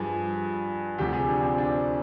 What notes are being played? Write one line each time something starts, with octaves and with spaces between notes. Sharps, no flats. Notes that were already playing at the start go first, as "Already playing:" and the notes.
Already playing: G2 F3 G#4
D2 C3 F3 G4
G#4
D4
C4
D4